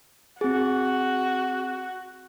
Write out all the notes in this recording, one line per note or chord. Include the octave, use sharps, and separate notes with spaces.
C4 F#4 G#4